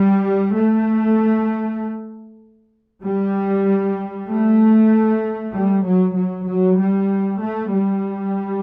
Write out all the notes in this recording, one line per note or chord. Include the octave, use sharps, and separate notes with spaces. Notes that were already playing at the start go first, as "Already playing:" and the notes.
Already playing: G3
A3
G3
A3
G3
F#3
F#3
F#3
G3
A3
G3